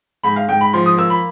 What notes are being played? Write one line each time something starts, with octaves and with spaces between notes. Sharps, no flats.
G#2 B5
F5
G#2 G5
B5
F3 C6
D#6
A#3 E6
B5